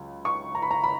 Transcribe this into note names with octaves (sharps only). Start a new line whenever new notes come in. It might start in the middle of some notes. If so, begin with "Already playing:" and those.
Already playing: C#2 C#3 F#3
C#6
A#5
B5
A#5
B5